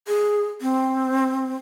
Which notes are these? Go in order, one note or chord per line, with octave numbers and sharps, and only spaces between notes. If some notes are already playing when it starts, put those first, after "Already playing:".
G#4
C4